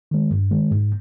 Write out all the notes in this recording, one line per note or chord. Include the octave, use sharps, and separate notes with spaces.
D#3 G#3
G2
D#3 G#3
G#2